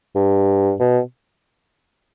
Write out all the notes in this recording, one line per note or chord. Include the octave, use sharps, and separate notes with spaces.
G2
B2